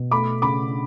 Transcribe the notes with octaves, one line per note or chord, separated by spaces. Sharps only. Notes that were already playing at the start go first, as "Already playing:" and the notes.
Already playing: B2
A3 B5 D6
C#3 B5 D6